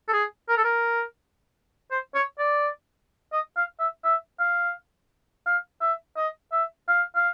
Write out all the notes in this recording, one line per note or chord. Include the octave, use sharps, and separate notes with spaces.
A4
G#4
A#4
A4
A#4
C5
C#5
D5
D#5
F5
E5
E5
F5
F5
E5
D#5
E5
F5
F5